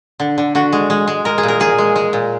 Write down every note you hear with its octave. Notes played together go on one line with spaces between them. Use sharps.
D3
D3
D3 F#4
G#3
G#3
G#3
G#3 A#4
G#4
A#2
A#4
A#2 G#4
G#3
G#3
A#2